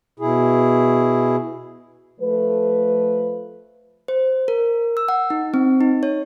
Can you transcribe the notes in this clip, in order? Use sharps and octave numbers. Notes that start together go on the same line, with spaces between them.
B2 E4 G#4
F3 A3 B4
C5
A#4
E6
F#5
D#4
C4
D#4
C#5